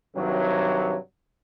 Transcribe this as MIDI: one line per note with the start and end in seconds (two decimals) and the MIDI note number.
0.16 0.96 43
0.16 0.96 48
0.16 0.96 51
0.16 0.96 54